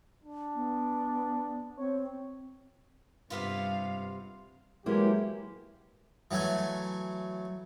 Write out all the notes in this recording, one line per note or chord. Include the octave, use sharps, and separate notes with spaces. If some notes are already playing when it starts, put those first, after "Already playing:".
D4
B3
C4 C#5
G2 C3 B3 F4 F5
E3 F#3 G#3 A#3 E4 G4
E3 F#3 A3 G#5